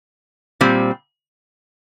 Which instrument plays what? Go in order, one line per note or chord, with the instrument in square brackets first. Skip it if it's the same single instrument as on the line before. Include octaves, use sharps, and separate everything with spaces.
[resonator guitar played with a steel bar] A#2 G3 C4